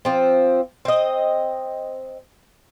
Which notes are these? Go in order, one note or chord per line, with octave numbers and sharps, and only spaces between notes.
F3 C4
C4 D#5